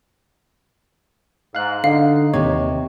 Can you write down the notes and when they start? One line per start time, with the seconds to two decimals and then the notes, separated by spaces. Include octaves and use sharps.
1.55 G#2 F5 F#6
1.84 D3 D#4 F5
2.34 D#2 C3 C#5